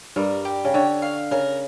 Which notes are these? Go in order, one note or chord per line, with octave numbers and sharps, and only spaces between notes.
G2 G3 A#4
G4
C#3
D3 C#5
F5
C#3 A#4